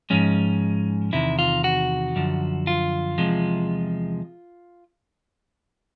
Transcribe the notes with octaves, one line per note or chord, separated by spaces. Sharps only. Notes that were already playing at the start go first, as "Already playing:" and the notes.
G#2 F3 G#3 C#4
E2 C3 D#3 E4
F4
F#4
F#2 D3 F3
F4
E2 C3 F3 G#3